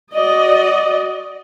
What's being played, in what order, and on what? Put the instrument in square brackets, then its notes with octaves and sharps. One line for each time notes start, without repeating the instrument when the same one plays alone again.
[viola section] F#4 D5 D#5